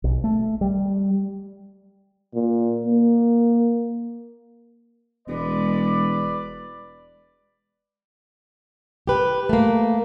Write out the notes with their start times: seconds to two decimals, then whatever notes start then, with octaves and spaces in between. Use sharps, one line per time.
0.04 B1
0.24 A3
0.61 G3
2.35 A#2
2.87 A#3
5.28 E1 G#3 B4 D5
9.07 G4 B4
9.49 A3 A#3